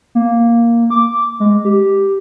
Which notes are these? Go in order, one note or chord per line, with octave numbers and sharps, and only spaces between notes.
A#3
D6
G#3
G4